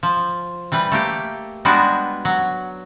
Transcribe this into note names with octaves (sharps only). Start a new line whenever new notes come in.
F3
E3 G3 B4
A3 A#3 G4
G3 G#3 B3 D4 F#4
F#3